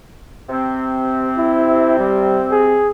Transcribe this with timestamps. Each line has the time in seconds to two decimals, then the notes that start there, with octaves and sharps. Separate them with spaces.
0.49 C3 C4
1.37 E4
1.99 G3
2.51 G#4